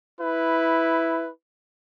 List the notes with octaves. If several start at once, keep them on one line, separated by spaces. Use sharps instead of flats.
E4 B4